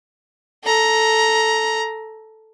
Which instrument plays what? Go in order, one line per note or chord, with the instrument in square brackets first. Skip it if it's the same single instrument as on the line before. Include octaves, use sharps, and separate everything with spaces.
[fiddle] A4 A#5